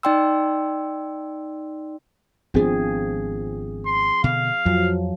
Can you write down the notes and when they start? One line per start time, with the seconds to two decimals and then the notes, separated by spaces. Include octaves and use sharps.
0.03 D#4 D5 G5 C6 E6
2.54 G#1 F3 B3 C4 D4 G#4
3.86 C6
4.24 B2 D3 F5
4.66 F2 F3 F#3